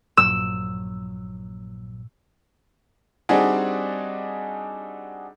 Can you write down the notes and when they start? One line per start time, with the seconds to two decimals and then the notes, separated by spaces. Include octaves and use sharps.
0.17 A#1 G2 A#2 F#3 E6
3.29 G3 C4 D4 D#4 F#4 G#4